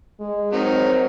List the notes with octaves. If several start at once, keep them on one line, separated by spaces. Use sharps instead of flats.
G#3
F#3 C4 D#4 A#4